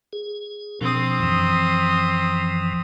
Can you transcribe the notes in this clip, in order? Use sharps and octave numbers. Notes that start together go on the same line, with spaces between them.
G#4
B2 F3 C4 D4 D#6
F#2 E3 F3